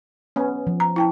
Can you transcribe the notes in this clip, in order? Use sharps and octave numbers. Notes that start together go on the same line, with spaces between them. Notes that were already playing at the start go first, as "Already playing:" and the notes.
B3 C#4
F3
A#5
E4 G5 A5